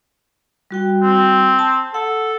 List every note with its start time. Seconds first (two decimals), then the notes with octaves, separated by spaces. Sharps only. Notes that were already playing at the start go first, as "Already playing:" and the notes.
0.71 G3 F#4 G5
1.03 C4
1.59 A5
1.94 A4 F#5